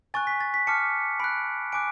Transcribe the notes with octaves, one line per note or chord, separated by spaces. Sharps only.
G#5 C#6 F#6 A6
B6
A6
B6
A5 D6 F6 C#7
B5 F#6 D7
G#5 D6 F#6 D7